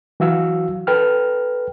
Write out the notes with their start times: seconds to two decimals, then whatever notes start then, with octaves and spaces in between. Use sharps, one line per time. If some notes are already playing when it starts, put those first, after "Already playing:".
0.20 E3 F#3 F#4 F5 E6
0.87 A4 B4 G5 F6